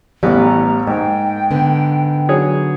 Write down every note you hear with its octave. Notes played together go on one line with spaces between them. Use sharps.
A1 E3 G3 A3 B3
A#5
G#2 A#3 G5
D3 B3
F#3 G#4 C#5